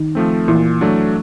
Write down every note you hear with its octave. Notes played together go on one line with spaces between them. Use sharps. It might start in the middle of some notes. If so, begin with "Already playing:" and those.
Already playing: D#3 D#4
F3 A3 C4
A#2 E3 E4
F#3 A3 D4